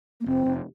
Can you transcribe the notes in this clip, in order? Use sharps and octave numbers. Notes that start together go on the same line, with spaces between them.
A#3
F1 C4
F1